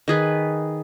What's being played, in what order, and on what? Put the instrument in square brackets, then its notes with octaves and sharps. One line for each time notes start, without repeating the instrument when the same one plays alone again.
[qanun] D#3 G#4 B4